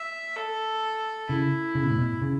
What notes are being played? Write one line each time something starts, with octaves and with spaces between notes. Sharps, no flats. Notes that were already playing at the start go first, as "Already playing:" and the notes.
Already playing: E5
A4
C#3 E4
C#3
B2
A2
B2
C#3